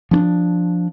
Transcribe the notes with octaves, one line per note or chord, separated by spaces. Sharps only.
F3 C#4 D4